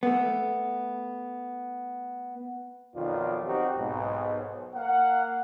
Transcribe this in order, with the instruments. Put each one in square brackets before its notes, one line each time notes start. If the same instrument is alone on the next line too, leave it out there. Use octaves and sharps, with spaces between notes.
[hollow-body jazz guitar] A3 B3
[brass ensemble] B1 F2 D#3 F4 D5
C4 D#4 F#4 G4
B1 G#2
A#3 F5 F#5